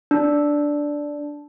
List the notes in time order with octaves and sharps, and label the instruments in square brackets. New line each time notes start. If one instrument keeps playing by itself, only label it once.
[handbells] D4